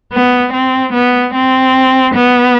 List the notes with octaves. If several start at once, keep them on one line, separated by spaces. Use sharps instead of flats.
B3
C4
B3
C4
B3